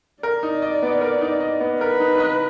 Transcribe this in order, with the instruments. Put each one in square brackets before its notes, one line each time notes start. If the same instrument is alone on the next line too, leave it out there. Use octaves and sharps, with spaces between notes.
[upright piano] A#4 [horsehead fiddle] D5
[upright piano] D#4
D#5
B3
A#4
D#4
D#5
B3
[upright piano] A#4 [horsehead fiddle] B4
[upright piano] D#4
D#5